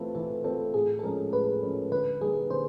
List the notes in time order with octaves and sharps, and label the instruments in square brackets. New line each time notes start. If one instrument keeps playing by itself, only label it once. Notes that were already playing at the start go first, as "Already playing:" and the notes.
Already playing: [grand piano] E3 A3 C4 F4 [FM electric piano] B4
[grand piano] E3 [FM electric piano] A4
[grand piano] A3 C4 F4 [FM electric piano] A4
[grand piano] A2 [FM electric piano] G#4
[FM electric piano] A4
[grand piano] F3 G#3 C#4 [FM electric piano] A#4
[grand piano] A2 [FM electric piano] B4
[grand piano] F3 G#3 C#4
[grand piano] D3 [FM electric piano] B4
[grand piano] G3 A#3 D#4 [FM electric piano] G#4
[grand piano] D3 [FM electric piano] C5